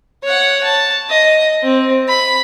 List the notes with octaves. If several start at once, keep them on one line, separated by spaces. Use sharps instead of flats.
C#5 F#5
A5
D#5
C4
B5